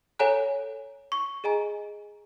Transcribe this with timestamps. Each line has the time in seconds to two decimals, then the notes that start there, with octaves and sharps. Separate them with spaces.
0.19 A4 C#5 F#5 G#5 A#5 F#6
1.12 C#6
1.44 G#4 D#5 G#5 A#5